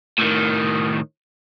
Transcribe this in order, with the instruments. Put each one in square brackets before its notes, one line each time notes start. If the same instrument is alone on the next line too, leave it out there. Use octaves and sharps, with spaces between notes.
[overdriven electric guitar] A2 D#3